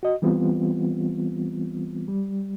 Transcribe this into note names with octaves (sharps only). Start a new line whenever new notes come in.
F#4 D#5
E3 G3 B3 C4 F4
G3